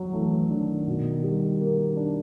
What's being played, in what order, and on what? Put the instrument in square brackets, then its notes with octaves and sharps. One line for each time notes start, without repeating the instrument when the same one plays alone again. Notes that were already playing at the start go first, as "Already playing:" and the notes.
Already playing: [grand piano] F#3
[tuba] E3 [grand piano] A3
[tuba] D#3 [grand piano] D4
[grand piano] B2
G3
A#3
D4